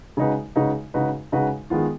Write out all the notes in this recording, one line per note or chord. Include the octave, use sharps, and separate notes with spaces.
C#3 G#3 D#4 F#4 B4
C#3 G#3 D#4 F#4 B4
C#3 G#3 D#4 F#4 B4
C#3 G#3 D#4 F#4 B4
D#3 G#3 B3 F4